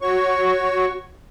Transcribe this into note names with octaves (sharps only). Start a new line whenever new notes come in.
F#4 C#5 C#6